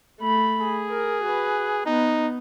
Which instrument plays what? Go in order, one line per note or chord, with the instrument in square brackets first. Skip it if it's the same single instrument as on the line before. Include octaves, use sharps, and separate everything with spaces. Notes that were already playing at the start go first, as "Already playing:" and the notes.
[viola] A3 B5
[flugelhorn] G#4
[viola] A#4
F#4 B4
[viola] B3 [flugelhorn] D#4